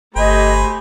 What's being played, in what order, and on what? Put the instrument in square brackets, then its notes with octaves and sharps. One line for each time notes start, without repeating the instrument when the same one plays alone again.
[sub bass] G1 [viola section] A3 G4 [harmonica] C5 G#5 B5 [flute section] D#5